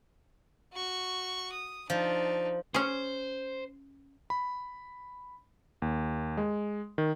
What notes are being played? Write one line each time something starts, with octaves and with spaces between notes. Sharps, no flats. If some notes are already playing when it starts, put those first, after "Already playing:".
F#4 C#6
D#6
F3 D4 D#4
C#4 G#4 C5
B5
D#2
G#3
D#3